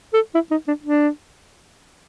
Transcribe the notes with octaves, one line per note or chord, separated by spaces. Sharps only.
A4
E4
D#4
D4
D4